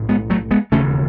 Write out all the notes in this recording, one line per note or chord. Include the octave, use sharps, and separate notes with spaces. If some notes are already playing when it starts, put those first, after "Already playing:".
Already playing: B1 A2
G#3 B3
F#3 A3
G#3 B3
E1 D#2 C#3 A3 C#4